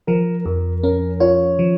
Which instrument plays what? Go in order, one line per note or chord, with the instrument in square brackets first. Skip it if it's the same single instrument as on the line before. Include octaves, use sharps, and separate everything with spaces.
[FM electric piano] F3 [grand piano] A#4
[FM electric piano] F2 [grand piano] A#4
[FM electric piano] C#4 [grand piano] A#4
[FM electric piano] F4 [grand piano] C#5
[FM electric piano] F3